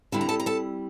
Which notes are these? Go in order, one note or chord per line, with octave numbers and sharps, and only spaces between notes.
D3 G3 C4 E4 A5
A#5
A4 A5
A#5
A4 A5